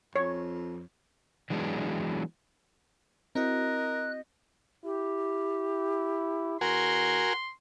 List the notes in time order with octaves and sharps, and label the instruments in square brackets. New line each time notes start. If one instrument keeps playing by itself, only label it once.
[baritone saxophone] F2 [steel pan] C#5
[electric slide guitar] E3 F#3 G#3 B3 D4
[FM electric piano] C4 E4 F#4 [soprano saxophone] A#4 [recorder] D#5 [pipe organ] F#6
[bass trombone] E4 [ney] G4
[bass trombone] E2 [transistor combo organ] F#4 A#4 G#5 [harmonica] C6